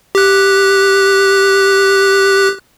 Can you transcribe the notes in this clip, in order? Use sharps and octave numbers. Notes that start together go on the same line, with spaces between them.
G4 F#6